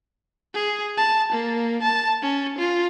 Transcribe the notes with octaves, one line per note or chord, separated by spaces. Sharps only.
G#4
A5
A#3
A5
C#4
F4